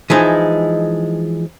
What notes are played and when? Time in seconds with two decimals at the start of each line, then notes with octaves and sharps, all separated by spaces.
0.10 E3 F3 G#3 D#4